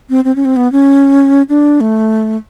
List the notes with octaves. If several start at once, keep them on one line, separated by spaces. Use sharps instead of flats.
C4
C4
C#4
C4
B3
C#4
D4
A3